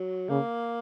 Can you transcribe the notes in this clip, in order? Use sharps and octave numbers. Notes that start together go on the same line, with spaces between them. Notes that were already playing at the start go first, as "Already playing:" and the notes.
Already playing: F#3
C#3 A#3